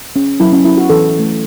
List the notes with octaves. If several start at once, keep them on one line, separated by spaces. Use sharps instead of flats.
C#4
F#3 E4
C#4
C#4 E4
F#4
E3 A4
A3 C#4